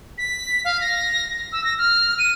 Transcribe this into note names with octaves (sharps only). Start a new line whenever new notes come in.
B6
F5
A#6
E6
A#6
F6
D#7